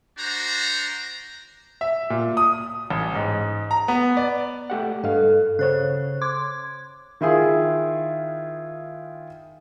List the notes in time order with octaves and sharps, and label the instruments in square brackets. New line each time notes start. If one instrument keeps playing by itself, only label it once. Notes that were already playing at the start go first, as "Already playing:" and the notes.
[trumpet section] D4 F#4 C5 A#5
[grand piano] E5
A#2
D#6
A1
G#2
A#5
B3
D5
[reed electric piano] A3 G4 F#5
[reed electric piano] G2 F5 [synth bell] A4
[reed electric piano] C#3 C#5 [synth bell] C5 F#6
[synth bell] C6 D6 G#6
[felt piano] D#3 E4 F4 G#4